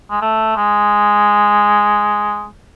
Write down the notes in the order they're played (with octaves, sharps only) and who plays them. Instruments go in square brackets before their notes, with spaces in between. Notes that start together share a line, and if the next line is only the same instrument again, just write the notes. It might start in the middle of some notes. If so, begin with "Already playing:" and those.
[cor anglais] G#3
A3
G#3